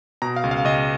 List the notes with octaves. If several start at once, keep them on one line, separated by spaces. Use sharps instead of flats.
B2 A#5
F5
C#2
F5
C#2 D#5